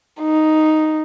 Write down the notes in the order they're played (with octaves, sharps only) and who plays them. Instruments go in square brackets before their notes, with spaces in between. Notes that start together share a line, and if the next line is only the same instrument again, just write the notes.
[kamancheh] D#4